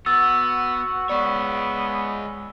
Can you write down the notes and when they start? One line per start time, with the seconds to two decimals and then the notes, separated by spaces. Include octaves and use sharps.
0.06 B3 F#4 E6 A6
1.09 G#3 B3 C#5 D5 C#6